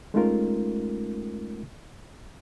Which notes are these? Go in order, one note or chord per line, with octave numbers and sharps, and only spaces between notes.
G#3 A3 C#4 D#4 F4 A#4